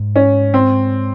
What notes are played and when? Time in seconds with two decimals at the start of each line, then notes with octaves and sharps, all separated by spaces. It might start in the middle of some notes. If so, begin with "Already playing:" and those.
Already playing: G#2
0.16 C#4
0.54 C4